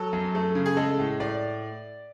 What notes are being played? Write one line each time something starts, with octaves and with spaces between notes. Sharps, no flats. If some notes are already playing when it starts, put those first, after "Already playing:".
Already playing: F#3 A4
F#2
A3
C#3
G#4
G#3 A4
A2
A2 D5